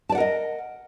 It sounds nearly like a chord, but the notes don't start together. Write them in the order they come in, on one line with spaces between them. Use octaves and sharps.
A5 D5 F#5 A#4 D#5